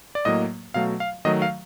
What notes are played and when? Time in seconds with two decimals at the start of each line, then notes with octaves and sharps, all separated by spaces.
0.15 D5
0.25 A2 F#3 A#3 D#5
0.74 B2 F#3 A3 F5
1.00 F5
1.25 D#3 F#3 A3 D#5
1.42 F5